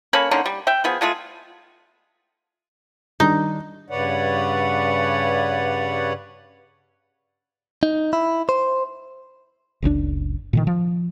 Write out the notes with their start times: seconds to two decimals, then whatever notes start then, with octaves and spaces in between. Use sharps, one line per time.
0.13 A#3 C#4 A4 B5
0.31 D3 A#3 C#4 D#4
0.46 G3
0.67 E5 G5
0.84 F3 B3 G#4
1.01 G#3 A3 F4 G#4
3.20 D#3 G3 D4 D#4
3.90 G2 C#3 B4 C#5 D5 F#5
7.83 D#4
8.13 E4
8.49 C5
9.82 F#1 C#2 C3 D4
10.53 A#2 D3 D#3
10.67 F3